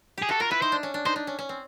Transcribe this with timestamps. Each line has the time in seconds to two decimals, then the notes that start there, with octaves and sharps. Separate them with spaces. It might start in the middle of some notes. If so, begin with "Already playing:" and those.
0.18 G4 G#4
0.29 F#4 A4
0.40 F4 A#4
0.51 E4 B4
0.62 D#4 C5
0.72 D4
0.83 C#4
0.94 D4
1.05 D#4 C5
1.16 D4
1.27 C#4
1.39 C#4
1.49 C4